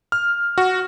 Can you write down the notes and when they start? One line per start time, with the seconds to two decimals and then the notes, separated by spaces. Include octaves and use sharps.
0.12 F6
0.58 F#4